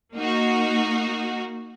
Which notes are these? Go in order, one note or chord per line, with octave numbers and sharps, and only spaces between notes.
A#3 D#4 F#4